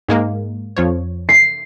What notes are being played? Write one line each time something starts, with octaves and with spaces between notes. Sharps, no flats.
G#2 G#3 A#3
F2 F3 C#5
C7